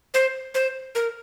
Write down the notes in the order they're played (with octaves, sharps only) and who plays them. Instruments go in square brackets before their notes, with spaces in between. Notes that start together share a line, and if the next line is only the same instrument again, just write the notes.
[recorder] C5
C5
A#4